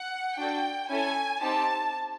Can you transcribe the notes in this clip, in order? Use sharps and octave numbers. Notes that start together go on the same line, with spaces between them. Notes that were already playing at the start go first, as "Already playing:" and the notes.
Already playing: F#5
D4 F#4 A4 G5
C#4 E4 A4 G#5
C4 D#4 G4 A5